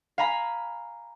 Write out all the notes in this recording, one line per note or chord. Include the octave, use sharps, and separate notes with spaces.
F5 G#5 A#5 B5